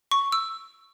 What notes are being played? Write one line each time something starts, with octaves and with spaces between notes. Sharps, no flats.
C#6
E6